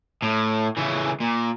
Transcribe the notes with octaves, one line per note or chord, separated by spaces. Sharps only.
A2
C#3 E3
A#2